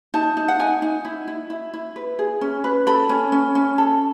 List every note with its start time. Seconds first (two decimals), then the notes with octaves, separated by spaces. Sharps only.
0.14 D#4 A5
0.37 D#4
0.48 F#5
0.59 D#4 G#5
0.82 D#4
1.05 E4
1.28 E4
1.50 E4
1.74 E4
1.96 B4
2.19 G#4
2.41 C#4
2.64 B4
2.87 A4 B5
3.09 C#4
3.32 C#4
3.55 C#4
3.78 A4